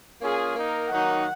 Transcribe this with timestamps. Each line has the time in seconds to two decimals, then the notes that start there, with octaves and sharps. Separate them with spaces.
0.20 A#3 C#4 F4 G#4
0.54 A#3 D#4 A#4
0.90 D#3 F#3 A#3 D#4 F#5